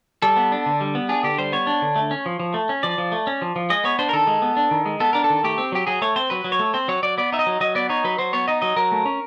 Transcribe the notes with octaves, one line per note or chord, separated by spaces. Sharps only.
G3 A4
B3
D4
D3
G3
B3
D4 G#4
D3 G4
G3 C5
B3 C#5
D4
D3
A3
C#4
F3
F3
A3
C#4
F3 D5
F3
A3
C#4
F3
F3
G#3 D#5
B3 C#5
D4 C5
A#4
D#3 A4
G#3
B3
D4
D#3
G#3
B3 A4
D4 A#4
A4
D#3
A3 G4
C4
F#3 G4
F#3 G#4
A3 C#5
C4 C5
F#3 B4
F#3
C#5
A3
C4 C5
F#3 C#5
F#3 D5
B3 D5
D#4 E5
D#5
F#3
F#3 D#5
B3 D5
D#4 C#5
F#3 B4
F#3 C5
B3 C#5
D#4 D#5
F#3 D#5
F#3 A#4
A3
C#4